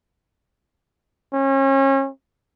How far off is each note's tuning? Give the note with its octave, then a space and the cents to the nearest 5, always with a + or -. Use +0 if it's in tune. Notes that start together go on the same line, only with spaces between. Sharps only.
C#4 -35